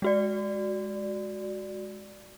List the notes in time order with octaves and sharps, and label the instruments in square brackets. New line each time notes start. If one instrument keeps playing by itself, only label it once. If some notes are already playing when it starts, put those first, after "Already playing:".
[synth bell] G#3 F#4 D5